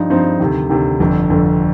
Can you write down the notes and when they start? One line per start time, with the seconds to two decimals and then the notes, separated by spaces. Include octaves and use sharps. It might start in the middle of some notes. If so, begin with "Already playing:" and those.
Already playing: G2 F3 D#4
0.10 G2 F3 C4 D#4
0.40 D2 C3 D#3
0.69 D2 C3 D#3
1.00 G1 F2 D3
1.30 G1 F2 D3